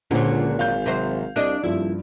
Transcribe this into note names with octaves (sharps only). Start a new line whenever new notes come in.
C#2 A#2 D3 F#3 C5
G#1 F5 G6
C3 F#3 C5
C2 D4 D#5
D#1 G2 F3 E4